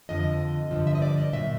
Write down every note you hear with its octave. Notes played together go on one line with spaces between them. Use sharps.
F2 D3 F3 D#5
G2 D3 F3
E5
D#5
D5
D#5
A#2 F#3 E5